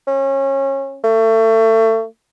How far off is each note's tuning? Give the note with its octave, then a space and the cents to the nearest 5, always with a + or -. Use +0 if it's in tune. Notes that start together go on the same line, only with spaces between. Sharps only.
C#4 -25
A3 +30